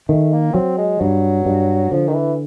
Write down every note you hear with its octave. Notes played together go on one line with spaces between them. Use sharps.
D#3 A3
A#3
F#3 C4
G#3
G2 F#3
G2
D3 F3
D#3
E3